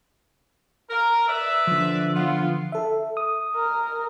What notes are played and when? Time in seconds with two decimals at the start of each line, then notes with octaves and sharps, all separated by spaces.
0.90 A#4
1.28 B4 D5 E5
1.67 D3 F3
2.14 B3 F4
2.72 A4 E5
3.17 D#6
3.55 A#4